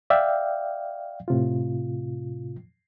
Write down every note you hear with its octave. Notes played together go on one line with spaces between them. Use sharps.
D5 E5 F5 G5
A2 C3 F4